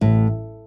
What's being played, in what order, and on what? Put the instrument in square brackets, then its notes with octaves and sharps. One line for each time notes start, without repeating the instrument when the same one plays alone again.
[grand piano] A1 [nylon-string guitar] A2